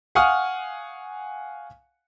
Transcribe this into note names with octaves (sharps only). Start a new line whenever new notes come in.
F5 F#5 G#5 C#6 D#6 F6